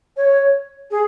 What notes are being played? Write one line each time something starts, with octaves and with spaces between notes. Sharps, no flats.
C#5
G#4